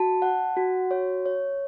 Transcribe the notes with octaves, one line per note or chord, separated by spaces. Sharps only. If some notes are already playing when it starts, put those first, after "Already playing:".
Already playing: F#4 A5
F#5
F#4
C#5
C#5